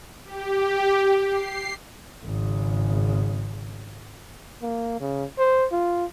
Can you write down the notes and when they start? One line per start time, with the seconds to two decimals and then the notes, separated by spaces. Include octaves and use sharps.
0.25 G4
1.28 C7
2.25 G#1 C#3
4.62 A#3
5.00 C#3
5.38 C5
5.72 F4